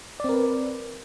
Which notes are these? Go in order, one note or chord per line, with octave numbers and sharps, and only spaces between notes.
C4 A#4 B4 D5